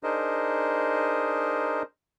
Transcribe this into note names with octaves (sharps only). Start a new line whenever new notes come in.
D4 D#4 G#4 A#4 C5 D#5